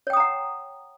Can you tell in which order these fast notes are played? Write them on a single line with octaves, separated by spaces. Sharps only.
C#5 G5 D#6 A#5 F#5